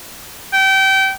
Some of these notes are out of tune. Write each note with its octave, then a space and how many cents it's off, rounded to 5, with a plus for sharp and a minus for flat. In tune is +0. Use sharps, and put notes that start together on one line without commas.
G5 -25